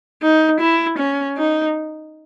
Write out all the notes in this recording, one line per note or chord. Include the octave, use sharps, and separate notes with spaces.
D#4
E4
C#4
D#4